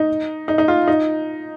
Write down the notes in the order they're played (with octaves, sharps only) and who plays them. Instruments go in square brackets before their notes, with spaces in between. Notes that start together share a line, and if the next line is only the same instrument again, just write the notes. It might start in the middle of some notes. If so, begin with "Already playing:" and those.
Already playing: [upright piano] D#4
D#4
D#4
F4
D#4